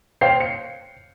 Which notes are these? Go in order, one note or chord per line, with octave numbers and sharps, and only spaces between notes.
C5 C#5 F5 G5 C7
C#7